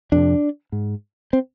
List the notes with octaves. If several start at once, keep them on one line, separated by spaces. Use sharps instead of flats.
F2 C3 D4
G#2
C4